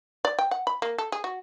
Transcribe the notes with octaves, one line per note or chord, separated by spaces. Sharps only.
D5
G5
F#5
B5
A#3
A4
G#4
F#4